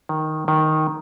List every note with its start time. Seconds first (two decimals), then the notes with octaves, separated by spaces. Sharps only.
0.09 D#3
0.48 D#3